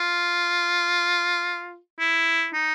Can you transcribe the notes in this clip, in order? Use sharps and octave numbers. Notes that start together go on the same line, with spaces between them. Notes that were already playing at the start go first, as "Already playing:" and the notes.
Already playing: F4
E4
D#4